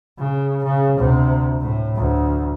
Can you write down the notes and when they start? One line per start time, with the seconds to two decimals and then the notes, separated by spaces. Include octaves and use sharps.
0.19 C#3
0.64 C#3
0.98 D2 C3
1.61 A2
1.95 D2